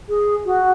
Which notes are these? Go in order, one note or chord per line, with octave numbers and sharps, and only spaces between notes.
G#4
F#4